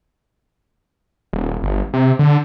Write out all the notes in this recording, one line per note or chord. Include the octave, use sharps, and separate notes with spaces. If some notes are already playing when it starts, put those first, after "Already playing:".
D#1
G1
C3
D3